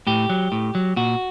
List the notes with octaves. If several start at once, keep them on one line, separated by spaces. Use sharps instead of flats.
A2 G4
F#3
A2
F#3
A#2 F#4